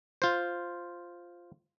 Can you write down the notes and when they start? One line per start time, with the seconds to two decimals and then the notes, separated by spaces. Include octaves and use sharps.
0.22 F4 C5